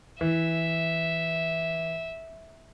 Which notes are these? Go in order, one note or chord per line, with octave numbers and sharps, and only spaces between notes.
E3 E5